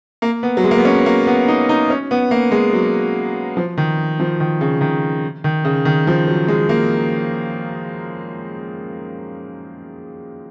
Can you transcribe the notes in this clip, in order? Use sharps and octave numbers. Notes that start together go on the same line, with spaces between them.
A#3
B3
F#3
G#3
A#3
B3
C#4
A#3
B3
D#4
D#4
C#4
B3
A#3
G#3
F#3
F3
D#3
F3
D#3
C#3
D#3
D#3
C#3
D#3
F3
F#3
G#3
A#3